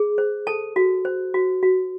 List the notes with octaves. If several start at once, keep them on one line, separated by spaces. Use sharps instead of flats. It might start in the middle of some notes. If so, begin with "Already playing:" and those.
Already playing: G#4
C5
A4 A5
F#4
C5
F#4
F#4